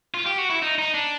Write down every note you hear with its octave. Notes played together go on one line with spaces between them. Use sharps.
F4
G4
F#4
E4
D#4
D#4
D4